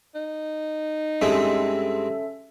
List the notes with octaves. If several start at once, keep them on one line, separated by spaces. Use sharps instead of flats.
D#4
G2 G#3 C4 C#4 A4 E5